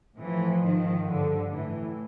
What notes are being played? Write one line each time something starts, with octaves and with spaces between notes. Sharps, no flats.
A2 E3 F3
G#2 D#3
G2 D3
A2 E3